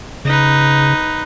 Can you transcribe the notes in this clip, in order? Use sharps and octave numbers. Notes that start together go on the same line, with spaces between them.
C#3 D#4 B4